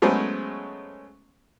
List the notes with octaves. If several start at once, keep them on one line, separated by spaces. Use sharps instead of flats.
F#3 G#3 A3 B3 C#4 C5